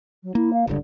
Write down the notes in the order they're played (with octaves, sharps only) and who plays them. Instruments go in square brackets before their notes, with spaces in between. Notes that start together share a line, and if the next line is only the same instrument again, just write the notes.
[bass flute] F#3
[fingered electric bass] A#3 [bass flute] E4
[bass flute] F5
[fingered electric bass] D1 C#2 G2 [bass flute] D3